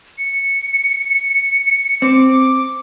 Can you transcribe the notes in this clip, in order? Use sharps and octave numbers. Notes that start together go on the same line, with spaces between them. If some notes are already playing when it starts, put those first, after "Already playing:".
C#7
C4 D6